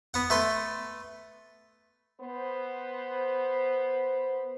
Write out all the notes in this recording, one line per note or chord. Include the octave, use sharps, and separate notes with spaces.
B3 F#5
A3 B4 C6
B3 C5